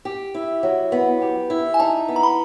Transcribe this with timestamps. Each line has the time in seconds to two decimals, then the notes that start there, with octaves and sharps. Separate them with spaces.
0.05 G4
0.35 E4
0.63 F#3
0.92 B3
1.22 G4
1.50 E4
1.74 G#5
1.80 D#4 A5
2.09 B3
2.16 A#5
2.23 B5